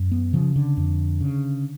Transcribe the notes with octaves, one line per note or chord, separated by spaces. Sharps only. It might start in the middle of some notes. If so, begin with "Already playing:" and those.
Already playing: F#2
B3
C#3 F3
D3
F2
C#3